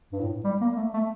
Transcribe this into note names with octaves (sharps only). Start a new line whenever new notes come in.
G2
A2
G3
A#3
A3
A3